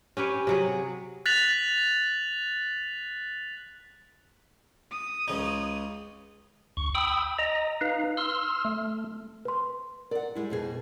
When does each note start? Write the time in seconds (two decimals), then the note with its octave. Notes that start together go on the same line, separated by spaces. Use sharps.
0.17 C#4 G4 B4 C#5
0.47 C3 F#3 G#4
1.26 F#6 A6 B6 F7 F#7
4.91 D#6
5.28 C#2 C#3 D#4
6.77 D2 C#6
6.95 G5 B5 D#6 E6
7.39 D#5 A#5
7.81 D#4 B4 F5
8.17 C6 E6 F6
8.65 A3
9.45 B4 C6
10.11 A#4 D5 F#5
10.35 G3 G#3 E4
10.50 F2 B2 G#4